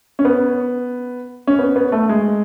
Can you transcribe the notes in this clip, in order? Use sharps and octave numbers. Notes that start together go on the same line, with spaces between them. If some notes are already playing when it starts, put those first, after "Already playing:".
C#4
B3
C#4
B3
B3
A3
G#3